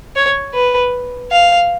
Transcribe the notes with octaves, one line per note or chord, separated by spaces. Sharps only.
C#5
B4
F5